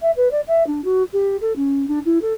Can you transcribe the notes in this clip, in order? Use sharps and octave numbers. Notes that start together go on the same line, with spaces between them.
E5
B4
D5
E5
D4
F#4
G4
A4
C#4
D4
E4
A4